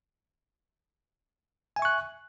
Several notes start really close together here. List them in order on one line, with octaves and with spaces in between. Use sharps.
G#5 E5 C#6 F#6